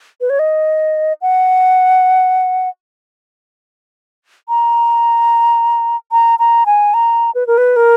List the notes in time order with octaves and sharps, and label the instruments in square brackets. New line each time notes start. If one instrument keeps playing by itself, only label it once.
[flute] B4
C#5
D#5
F#5
A#5
A#5
A#5
G#5
A#5
B4
A#4
B4
A#4